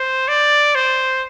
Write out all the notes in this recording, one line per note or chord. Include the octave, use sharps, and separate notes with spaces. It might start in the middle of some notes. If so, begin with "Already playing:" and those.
Already playing: C5
D5
C5